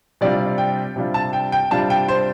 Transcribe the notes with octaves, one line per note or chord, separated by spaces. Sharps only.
C3 G3 D4 F4 D5
G5
C3 G3 D4 F4
A5
G5
G5
C3 G3 D4 F4 A5
G5
C5